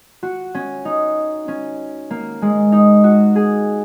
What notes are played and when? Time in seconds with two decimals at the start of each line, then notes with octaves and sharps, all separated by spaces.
0.23 F#4
0.55 C#4
0.85 D#4
1.48 C#4
2.10 A#3
2.42 G#3
2.72 D#4
3.04 F#4
3.35 G#4